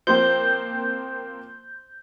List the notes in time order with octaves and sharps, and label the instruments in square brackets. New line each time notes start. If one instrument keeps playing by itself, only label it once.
[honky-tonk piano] F3 A#3 C4 [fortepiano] C5 [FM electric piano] G6